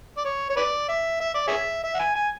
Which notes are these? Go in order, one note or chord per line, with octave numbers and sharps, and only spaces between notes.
D5
C#5
C#5
B4 D5
E5
E5
D5
G#4 C#5 E5
E5
F#5
G#5
G#5